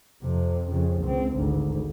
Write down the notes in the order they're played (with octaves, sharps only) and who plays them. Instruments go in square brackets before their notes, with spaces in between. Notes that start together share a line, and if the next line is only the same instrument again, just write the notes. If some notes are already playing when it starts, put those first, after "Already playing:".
[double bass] F2 C3
F2 C#3
C#2 C4
G#1 D2